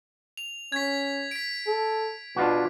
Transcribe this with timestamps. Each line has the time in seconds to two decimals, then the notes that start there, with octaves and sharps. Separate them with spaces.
0.37 F7
0.72 C#4 G#6 B6
1.31 B6 D7
1.67 A4
2.36 B2 D4 F4 F#4